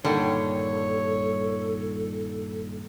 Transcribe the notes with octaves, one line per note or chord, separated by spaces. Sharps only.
G2 A#2 D3 D#3 G3 A4 C#5